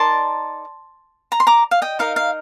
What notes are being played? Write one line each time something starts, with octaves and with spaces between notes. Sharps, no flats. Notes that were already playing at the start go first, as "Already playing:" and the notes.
Already playing: D#4 A#4 D5 A5 C6
A#5
C6
A#5 D6
F5
D#5 G5
D#4 A#4 D#5 F5
F5